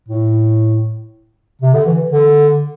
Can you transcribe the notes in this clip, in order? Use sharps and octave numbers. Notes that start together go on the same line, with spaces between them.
A2
C3
D3
E3
D3